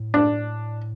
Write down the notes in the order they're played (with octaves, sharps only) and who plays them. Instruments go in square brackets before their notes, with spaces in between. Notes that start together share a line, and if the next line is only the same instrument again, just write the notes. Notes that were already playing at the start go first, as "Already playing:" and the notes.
Already playing: [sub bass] A2
[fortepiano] D4